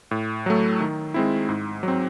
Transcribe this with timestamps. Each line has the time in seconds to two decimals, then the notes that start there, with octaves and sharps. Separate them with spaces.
0.11 A2
0.46 F#3 A3
0.80 D#3
1.14 G#3 C4 E4
1.49 G#2
1.83 F#3 C4